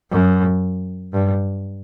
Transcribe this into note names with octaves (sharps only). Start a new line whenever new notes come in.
F#2
G2